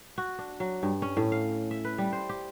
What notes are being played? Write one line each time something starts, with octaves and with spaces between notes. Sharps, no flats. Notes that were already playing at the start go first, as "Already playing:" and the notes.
F#4
D4
F#3
G2
C#4
A2
F5
E5
B4
G3
C5
G4